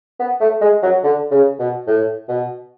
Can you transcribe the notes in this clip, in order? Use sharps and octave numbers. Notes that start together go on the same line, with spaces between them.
B3
A3
G#3
F#3
D3
C#3
B2
A2
B2